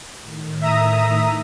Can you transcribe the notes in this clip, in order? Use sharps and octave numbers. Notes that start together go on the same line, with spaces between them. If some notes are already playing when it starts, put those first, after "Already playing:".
A2 D#3
E5 A#5 D#6